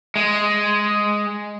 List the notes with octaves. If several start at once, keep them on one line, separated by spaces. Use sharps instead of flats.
G#3